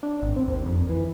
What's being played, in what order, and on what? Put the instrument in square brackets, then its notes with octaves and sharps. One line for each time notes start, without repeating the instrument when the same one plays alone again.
[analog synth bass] D4
G#1
C4
D#2
F2
E3